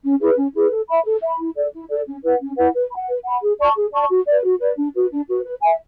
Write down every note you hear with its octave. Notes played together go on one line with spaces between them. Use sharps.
C#4
E4 G#4 B4
C#4
E4 G#4 B4
A4
E5 B5
A4
E5 B5
E4
A4 D5
E4
A4 D5
C#4
E4 B4 F#5
C#4
E4 B4 F#5
B4
B5
F#5
B4
F#5 B5
G#4
D5 A5 C#6
G#4
D5 A5 C#6
F#4
B4 D5
F#4
B4 D5
D4
F#4 B4
D4
F#4 B4
B4
E5 G#5